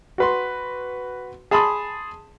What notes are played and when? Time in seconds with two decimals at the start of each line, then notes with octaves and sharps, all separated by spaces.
0.18 F#4 B4 C6
1.51 G#4 A5 B5 C6 D#6